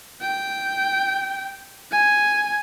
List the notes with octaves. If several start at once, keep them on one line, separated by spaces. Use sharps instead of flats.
G5
G#5